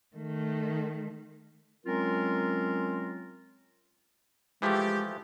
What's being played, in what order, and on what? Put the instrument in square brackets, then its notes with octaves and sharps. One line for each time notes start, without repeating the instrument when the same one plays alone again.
[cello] D#3 A3
[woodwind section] F#3 G#3 C4 C#4 F4 A#4
[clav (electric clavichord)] E3 F3 A3 [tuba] G#3 [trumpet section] G4